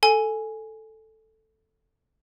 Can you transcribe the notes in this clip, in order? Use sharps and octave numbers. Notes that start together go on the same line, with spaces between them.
A4 G#5